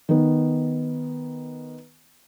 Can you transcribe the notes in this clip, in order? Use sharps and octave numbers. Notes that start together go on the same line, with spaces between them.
D#3 B3